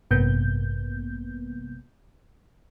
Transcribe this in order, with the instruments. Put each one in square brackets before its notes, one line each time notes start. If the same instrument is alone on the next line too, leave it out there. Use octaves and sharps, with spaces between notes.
[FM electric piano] A1 G2 C3 A#3 B3 G6